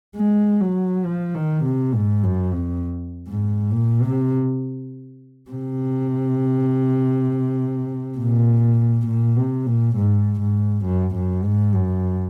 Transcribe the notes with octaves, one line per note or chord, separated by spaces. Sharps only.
G#3
F#3
F3
D#3
C3
G#2
F#2
F2
G#2
A#2
C3
C3
A#2
A#2
C3
A#2
G#2
G#2
F#2
F#2
G#2
F#2